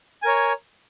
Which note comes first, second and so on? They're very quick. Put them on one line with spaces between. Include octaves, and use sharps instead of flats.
G#5 A#4 C#5